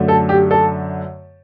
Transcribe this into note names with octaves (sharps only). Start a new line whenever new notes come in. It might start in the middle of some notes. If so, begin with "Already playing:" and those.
Already playing: F#2 D3 A3
A4
G4
A4